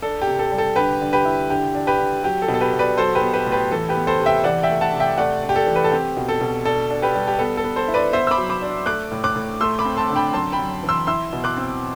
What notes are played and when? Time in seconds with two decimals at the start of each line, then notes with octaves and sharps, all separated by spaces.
0.02 D4 A4
0.22 G4
0.27 C3
0.39 A4
0.52 G3
0.58 A4
0.76 D3 G4 B4
1.01 D3
1.13 G4 B4
1.25 E4
1.50 D3 G4
1.75 D4
1.87 G4 B4
1.98 D3
2.23 F#3 G4
2.42 A4
2.48 B2
2.54 A4
2.61 G4 B4
2.73 B2
2.79 B4 D5
2.97 F#3 A4 C5
3.15 G4 B4
3.21 B3
3.33 G4 B4
3.46 A2
3.52 G4 B4
3.71 E3 A4
3.89 G4 B4
3.95 B3
4.07 A4 C5
4.20 C3
4.26 E5 G5
4.44 E3 D5 F#5
4.63 E5 G5
4.70 A3
4.81 F#5 A5
4.93 C3
5.00 E5 G5
5.18 A3 D5 F#5
5.43 D4
5.49 G4
5.56 A4
5.67 E3
5.76 B4
5.84 A4
5.91 C4 G4
6.17 B2
6.29 A4
6.41 B2
6.65 D4 A4
6.90 D4
7.02 G4 B4
7.15 G3
7.27 G4
7.39 B3 A4
7.57 A4
7.64 B3
7.76 A4 C5
7.88 E4
7.94 B4 D5
8.13 B3 C5 E5
8.27 E6
8.31 B5 D6
8.38 F#3
8.49 B5 D6
8.62 D4
8.86 A3 D6 F#6
9.12 A2
9.24 D6 F#6
9.36 A2
9.61 A3 C6 E6
9.79 B5 D6
9.85 C4
9.97 A5 C6
10.10 D3
10.16 G5 B5
10.34 F#2 A5 C6
10.52 G5 B5
10.59 F#2
10.83 E3
10.89 C6 E6
11.07 E4 C6 E6
11.33 B2
11.44 D6 F#6
11.57 C4